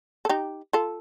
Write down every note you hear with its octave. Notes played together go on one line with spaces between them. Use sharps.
A4
D#4 G4
F4 A4